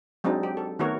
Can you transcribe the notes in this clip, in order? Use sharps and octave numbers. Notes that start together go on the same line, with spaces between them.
F#3 G#3 C4 D4 D#4
G4
A4
D#3 A3 B3 F#4 A#4 C#5